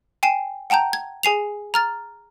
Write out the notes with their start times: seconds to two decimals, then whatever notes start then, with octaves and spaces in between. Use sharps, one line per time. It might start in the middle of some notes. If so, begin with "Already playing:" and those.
0.23 G5 G#5 C7 E7
0.70 F#5 G5 A5 A#5 G6
0.93 G#6
1.23 G#4 G#5 C7 F7
1.74 A#5 F6 A6